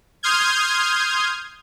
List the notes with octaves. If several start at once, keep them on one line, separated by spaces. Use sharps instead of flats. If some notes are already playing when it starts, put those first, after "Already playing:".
C6 D#6 F6 G6 G#6